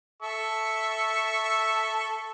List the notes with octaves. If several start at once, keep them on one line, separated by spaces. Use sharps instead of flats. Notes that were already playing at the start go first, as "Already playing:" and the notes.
A4 E5 C#6